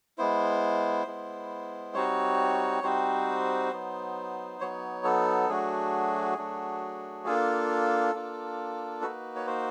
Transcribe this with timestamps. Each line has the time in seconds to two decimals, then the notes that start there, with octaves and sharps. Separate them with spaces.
0.18 G#3 B3 E4 C5
1.07 G#3 B3 E4
1.94 G3 C4 D#4 F#4 C#5
2.83 G3 C4 D#4 F#4 C5
3.72 F#3 B3 D#4
4.61 F#3 B3 D#4 C#5
5.04 A4
5.49 F#3 A3 D4 F#4 G#4
6.38 F#3 A3 D4 F#4
7.26 A#3 D4 F4 A4
8.14 A#3 D4 F4
9.02 A#3 D#4 F#4 B4
9.36 C#5
9.47 C5